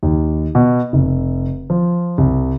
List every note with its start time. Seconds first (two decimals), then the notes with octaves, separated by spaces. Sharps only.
0.03 D#2
0.55 B2
0.93 F1
1.70 F3
2.18 C2